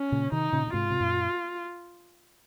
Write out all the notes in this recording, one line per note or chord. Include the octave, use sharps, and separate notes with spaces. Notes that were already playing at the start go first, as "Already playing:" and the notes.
Already playing: C#4
A#2 C#3
C3 D#3 D#4
A#2 C#3
C#3
G#2 C3 F4
C3
F#2 A#2